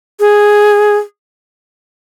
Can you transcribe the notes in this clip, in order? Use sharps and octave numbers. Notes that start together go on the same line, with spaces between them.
G#4